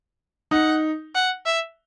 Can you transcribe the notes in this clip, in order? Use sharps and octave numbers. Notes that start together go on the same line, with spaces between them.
D#4 F#5
F#5
E5